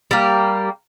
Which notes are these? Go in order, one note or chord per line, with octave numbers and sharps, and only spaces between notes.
G3 A#3